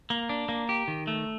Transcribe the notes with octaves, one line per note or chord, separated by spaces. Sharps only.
A#3
D4
A#3
G4
D#3
A3